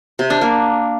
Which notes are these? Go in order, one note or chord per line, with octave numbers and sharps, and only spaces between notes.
C3
D4
A#3